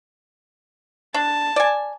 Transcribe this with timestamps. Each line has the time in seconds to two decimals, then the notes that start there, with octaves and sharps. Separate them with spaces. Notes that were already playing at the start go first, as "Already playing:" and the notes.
1.14 D4 A5
1.56 D5 G#5